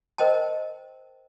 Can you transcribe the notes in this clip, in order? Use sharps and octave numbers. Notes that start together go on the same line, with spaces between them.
A#4 C5 D#5 G5 A5